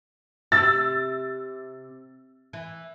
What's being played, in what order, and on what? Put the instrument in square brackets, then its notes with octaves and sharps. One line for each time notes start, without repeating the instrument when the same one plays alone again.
[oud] C3 [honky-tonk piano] E6 A6
[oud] E3